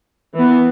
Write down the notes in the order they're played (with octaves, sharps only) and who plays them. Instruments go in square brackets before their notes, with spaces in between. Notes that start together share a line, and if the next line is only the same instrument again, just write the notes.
[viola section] E3 B3